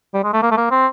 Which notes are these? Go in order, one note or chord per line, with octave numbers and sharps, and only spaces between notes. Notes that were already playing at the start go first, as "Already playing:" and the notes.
G3
G#3
A3
A#3
A3
A#3
C4